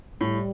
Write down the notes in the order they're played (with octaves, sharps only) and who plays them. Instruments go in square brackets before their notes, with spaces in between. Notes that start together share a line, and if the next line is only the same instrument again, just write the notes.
[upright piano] A2 [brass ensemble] G3